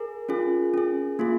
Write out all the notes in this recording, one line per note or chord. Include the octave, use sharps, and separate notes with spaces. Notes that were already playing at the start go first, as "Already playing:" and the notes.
Already playing: G#4 A#4
C#4 F4 G#4
C#4 G#4
A#3 F4 G#4